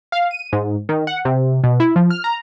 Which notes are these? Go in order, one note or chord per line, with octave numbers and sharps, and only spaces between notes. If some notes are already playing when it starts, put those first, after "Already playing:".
F5
D#7
G#2
D#3
F#5
C3
B2
E4
F3
F6
A#5